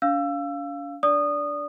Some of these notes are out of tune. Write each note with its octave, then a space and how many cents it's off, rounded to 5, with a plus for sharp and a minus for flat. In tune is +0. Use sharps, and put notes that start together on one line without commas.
D4 -45 F5 +0 E6 +20
D4 -5 D5 -15 D#6 -20